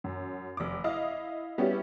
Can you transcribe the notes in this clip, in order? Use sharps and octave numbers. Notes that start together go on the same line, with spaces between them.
F#2
F1 D6
E4 D#5 F5 D#6
G3 B3 C#4 E4 G4